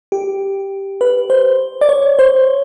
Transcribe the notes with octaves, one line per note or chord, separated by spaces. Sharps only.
G4
B4
C5
D5
C#5
C5